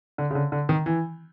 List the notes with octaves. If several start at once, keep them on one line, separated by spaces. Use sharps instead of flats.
D3
C#3
D3
D3
D#3
E3